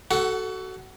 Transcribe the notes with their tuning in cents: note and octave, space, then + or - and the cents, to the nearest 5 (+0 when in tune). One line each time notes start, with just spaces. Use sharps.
F#4 +25 A4 +0 F#5 +0